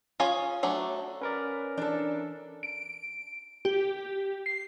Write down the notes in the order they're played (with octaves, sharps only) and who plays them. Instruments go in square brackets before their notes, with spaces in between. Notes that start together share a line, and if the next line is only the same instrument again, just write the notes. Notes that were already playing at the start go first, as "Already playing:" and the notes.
[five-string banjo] C#4 F4 G#4 G#5
F#3 A3 D4
[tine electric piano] C#4 A#4 D5 [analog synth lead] B4
[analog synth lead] E3 [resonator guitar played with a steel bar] D4 A4
[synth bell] D7
G4
C7